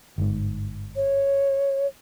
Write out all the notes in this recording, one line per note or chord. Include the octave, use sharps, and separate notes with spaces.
G1 G#2
C#5